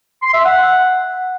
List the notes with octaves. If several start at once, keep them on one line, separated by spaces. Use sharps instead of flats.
C6
E5
F#5